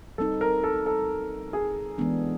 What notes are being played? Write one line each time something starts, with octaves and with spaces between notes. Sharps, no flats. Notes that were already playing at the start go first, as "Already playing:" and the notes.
G3 C4 D#4 A4
A#4
A4
A4
G#4
E3 G#3 B3 D4